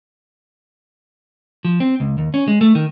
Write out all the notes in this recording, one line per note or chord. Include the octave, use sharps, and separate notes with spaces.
F3
C4
C#2
D#2
C#4
G#3
A3
D#3